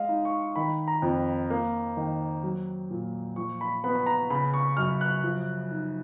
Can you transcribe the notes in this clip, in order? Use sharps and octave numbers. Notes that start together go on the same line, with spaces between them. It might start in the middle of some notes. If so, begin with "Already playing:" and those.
Already playing: G#3 D#5 F5
D#4
C#6
D#3 B5
A#5
F2
A#3
D#3
F#3
A#2
F3 C#6
B5
B3 B5
B5
A#5
C#3 B5
C#6
F#2 F6
F#6
F3
D#4